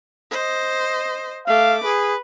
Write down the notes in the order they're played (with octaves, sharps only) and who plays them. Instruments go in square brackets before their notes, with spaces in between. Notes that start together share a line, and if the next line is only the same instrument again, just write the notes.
[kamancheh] C5 D#5
[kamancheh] A3 D6 [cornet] F5
[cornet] G#4 [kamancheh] B4